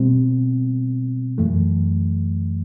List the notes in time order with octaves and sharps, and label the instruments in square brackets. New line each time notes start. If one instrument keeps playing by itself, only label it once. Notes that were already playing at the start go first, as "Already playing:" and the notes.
Already playing: [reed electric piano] B2 G3 C4
F#2 E3 A3